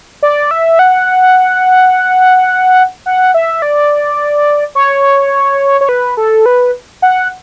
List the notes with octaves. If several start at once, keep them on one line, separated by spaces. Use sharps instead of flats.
D5
E5
F#5
F#5
E5
D5
C#5
C#5
B4
A4
B4
F#5